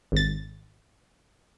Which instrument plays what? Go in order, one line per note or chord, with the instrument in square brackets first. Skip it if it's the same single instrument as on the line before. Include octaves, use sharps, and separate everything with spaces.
[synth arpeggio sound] G#1 A6